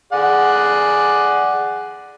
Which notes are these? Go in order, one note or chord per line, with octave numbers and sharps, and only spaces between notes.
G#4 D5 F#5